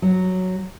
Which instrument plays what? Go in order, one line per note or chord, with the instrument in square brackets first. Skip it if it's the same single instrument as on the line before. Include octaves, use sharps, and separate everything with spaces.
[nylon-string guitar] F#3